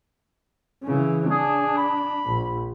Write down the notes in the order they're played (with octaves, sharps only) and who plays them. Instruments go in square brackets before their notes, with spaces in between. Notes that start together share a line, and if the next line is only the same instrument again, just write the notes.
[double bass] C#3 E3
[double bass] D4 [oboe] G#4
[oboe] B5
[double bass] A#1